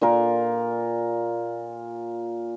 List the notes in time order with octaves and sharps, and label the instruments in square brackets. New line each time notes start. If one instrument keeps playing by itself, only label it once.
[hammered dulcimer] A#2 F4 A#4